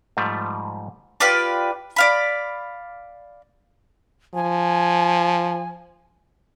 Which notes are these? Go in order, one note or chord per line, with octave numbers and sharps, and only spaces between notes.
G#2 F3 G3 A3
F4 G4 B4 D5
D5 F5 B5
F3 G#5